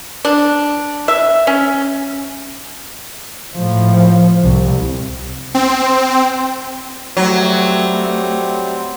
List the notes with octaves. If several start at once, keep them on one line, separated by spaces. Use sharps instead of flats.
D4
E5
C#4
A2 F3
C2
C4
F#3 G3 A3 C4